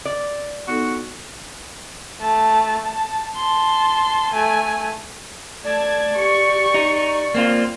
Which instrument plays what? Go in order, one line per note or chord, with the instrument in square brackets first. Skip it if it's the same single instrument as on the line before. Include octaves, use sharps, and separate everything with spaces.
[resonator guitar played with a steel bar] D5
[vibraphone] B3 D#4 A4 [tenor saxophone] F#4
[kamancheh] A3 A5
A5
A5 C6
A3 G#5
[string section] A3 A5 G#6 [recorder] D5
[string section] G4 C#6
[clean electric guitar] D#4
A#3 C4 F4